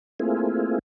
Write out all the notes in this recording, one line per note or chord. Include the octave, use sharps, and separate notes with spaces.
A3 A#3 C4 E4 F4 G#4